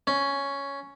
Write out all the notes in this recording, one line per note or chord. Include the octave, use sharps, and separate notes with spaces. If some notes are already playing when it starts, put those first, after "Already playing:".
C#4